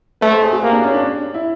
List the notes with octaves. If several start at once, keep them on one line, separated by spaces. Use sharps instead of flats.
A3 B4
C5
G#4
F#4
A#3 G4
D4
C#4
D4
E4